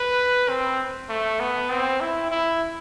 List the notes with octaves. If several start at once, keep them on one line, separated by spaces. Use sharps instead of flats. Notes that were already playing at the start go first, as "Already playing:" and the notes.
Already playing: B4
C4
A3
B3
C4
E4
E4